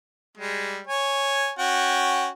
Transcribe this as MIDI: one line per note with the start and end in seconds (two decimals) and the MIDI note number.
0.37 0.81 55
0.37 0.81 56
0.87 1.51 73
0.87 1.51 80
1.59 2.28 61
1.59 2.28 66
1.59 2.28 79